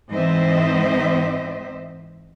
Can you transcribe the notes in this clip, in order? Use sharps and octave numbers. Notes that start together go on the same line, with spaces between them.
G#2 E3 C4 C5 D#5 E5